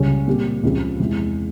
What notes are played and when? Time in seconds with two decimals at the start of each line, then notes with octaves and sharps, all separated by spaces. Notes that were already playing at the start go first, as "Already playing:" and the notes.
Already playing: C#2 C#3 G3 C#4
0.27 A#2 G3 C4 G4
0.63 C#2 C#3 F3 C4 G4
1.00 E2 C3 E3 G#3